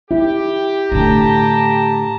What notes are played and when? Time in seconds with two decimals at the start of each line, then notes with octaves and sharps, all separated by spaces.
0.11 E4 G4
0.92 A2 D3 A5 A#5